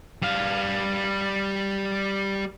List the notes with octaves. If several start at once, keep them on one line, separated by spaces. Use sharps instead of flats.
G3 F5